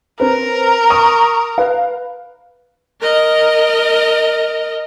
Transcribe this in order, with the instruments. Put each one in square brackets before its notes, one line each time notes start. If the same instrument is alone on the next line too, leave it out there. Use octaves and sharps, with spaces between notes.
[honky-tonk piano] C4 B4 [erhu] A#4
[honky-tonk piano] C#6 D#6
B4 F5
[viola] A#4 D#5